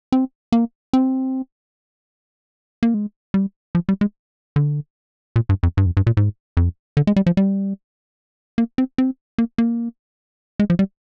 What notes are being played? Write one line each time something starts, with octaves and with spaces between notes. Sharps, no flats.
C4
A#3
C4
A#3
G#3
G3
F3
G3
G#3
D3
A#2
G2
F2
G2
F2
G2
A#2
G#2
F2
D3
G#3
G3
F3
G3
A#3
C4
C4
A#3
A#3
G#3
F3
G3